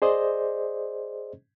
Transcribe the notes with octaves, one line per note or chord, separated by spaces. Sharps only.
G#4 C5 D5 D#5